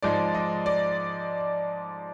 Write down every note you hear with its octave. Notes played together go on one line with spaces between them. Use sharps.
G#2 F3 G#3 D5
D#5
D5